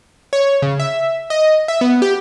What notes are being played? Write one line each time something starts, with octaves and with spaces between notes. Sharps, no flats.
C#5
C#3
E5
D#5
E5
B3
G4